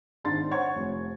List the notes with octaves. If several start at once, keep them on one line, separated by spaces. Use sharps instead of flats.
G#1 G#2 D4 C6 A6
C5 C#5 F#5 C#6 G#6
F1